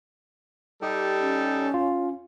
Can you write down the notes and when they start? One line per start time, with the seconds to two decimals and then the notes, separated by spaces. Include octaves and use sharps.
0.82 G3 D#4 G4 A4
1.20 C#4
1.74 F4